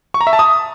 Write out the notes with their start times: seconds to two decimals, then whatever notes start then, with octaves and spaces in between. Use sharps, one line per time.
0.14 C#6
0.21 A#5
0.27 E5
0.33 A5
0.39 D#6